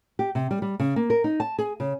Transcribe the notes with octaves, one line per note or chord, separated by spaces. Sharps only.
G4
C3
G3
G3
C#3
A#3
A#4
D#4
A5
G#4
C#3